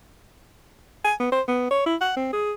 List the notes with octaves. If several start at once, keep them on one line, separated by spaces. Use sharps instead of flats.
G#5
B3
C5
B3
C#5
E4
F#5
C4
G#4